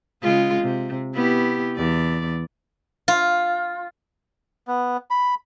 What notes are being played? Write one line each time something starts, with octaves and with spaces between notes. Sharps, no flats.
C#3 G#3 F4
C3
B3 E4 G4
E2 D5
F4
B3
B5